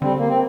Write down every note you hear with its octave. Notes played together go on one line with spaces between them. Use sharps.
D3 G3 C4
A#3
C4